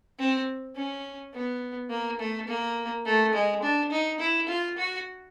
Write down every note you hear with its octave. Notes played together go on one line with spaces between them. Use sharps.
C4
C#4
B3
A#3
A3
A#3
A3
G#3
D4
D#4
E4
F4
F#4